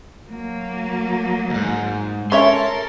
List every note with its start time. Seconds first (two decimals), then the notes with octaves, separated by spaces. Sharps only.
0.29 F#3 A#3
1.50 D#2 G#2
2.32 C#4 A4 A#4 C#5 E5 C6